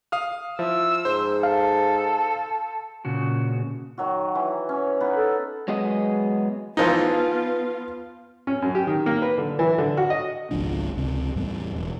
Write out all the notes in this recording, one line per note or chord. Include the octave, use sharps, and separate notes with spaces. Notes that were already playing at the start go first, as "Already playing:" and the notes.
F5 D#6 F6
F3 E4 E6
G#2 C5
A4 F5
A#2 C#3 F#4
D#3 F#3 F#4
E3
C#4
B3 D#4 B4
A4
F#3 G#3 B3 G#4 D#5
E3 F3 B3 D#4 F4
C#4
F#2
G4
D#3
A#3
B4
D3
E3
D3
F#4
D#5
G#1 C#2 F3 D4
C#2 C3
E2 A2 G3
E1